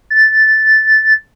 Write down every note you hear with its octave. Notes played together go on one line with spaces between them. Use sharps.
A6